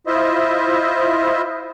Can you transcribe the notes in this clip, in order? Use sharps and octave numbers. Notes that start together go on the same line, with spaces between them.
E4 F4 C5 D#5 E5